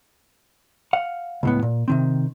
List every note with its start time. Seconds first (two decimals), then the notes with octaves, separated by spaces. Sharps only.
0.93 F5 F#5
1.43 C#2 A2 B3
1.63 A#2
1.88 C3 D#3 C4